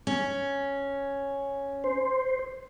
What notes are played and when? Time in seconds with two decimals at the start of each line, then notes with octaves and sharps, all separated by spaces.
0.07 C#4
1.84 C5